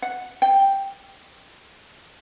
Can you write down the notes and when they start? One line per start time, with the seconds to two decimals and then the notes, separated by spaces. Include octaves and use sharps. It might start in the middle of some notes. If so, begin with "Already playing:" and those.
0.02 F#5
0.42 G5